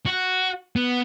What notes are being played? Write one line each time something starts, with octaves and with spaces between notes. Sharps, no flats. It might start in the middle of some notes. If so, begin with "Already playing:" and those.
F#4
B3